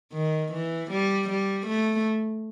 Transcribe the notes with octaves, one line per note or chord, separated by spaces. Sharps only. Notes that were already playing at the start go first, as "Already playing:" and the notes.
D#3
E3
G3
G3
A3